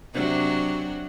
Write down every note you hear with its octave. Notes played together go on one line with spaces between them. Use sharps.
C3 F#3 D4